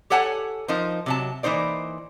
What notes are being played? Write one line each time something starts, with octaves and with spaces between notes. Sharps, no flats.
G4 A4 C#5 F#5 G#5 A5
F3 D#4 A#4 C5
C3 F#3 A5
E3 A#3 D#4 C5 D5